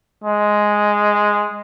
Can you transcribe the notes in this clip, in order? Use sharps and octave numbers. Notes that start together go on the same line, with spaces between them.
G#3